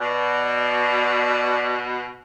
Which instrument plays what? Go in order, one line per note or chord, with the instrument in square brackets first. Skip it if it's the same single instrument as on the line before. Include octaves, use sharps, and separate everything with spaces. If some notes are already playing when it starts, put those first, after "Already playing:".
[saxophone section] B2 [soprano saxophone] D5